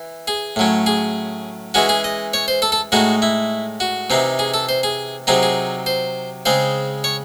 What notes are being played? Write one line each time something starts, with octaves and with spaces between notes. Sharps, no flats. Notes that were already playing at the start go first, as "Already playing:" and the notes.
Already playing: E3
G#4
A2 F#3 C#4
G#4
E3 G#3 C#4 F#4
G#4
D#5
C#5
C5
A4
A4
A2 G#3 D#4 F#4
E4
F#4
C3 E3 C4 D#4
G#4
A4
C5
G#4
C3 F#3 C4 D#4 G#4
G#4
C5
C#3 G#3 C4 C5
C#5